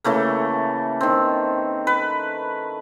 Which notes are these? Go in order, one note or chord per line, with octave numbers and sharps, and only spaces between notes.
C#3 E3 A3 A#3
D#3 C4
B4